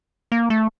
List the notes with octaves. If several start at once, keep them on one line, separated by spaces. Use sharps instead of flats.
A#3
A3